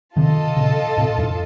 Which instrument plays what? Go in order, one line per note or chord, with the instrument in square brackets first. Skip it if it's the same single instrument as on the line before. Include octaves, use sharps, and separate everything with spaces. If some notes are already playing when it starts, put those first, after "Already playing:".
[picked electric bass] C3 D#3 [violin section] F4 A4 D#5 A5
[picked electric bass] A#2 C#3
A2 C3
F2 A2